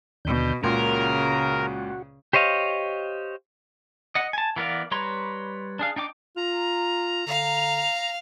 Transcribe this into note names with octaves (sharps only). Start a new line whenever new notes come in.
D#2 B2 D3 G6
C#2 A#2 C#3 F#4 A#4 C6
G4 C5 C#5 D#5 F5
D#5 F#5
G#5 A5
E3 B3 A#4 D5 F5
G3 B4 C#5 A#5 C6
D4 G#4 F5
D4 D#4 G5 D6
F4 A#5
D3 F5